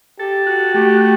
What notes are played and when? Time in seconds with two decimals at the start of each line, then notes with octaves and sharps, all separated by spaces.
0.19 G4 A4
0.47 F#4
0.74 A3 G4
1.01 F#4